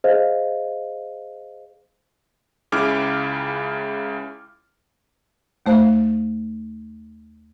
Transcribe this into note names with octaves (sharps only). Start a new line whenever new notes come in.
G#4 C5 D#5 F5
C#2 C#3 E4 D6 F6 D7
D#2 A3 C5 F5 F#6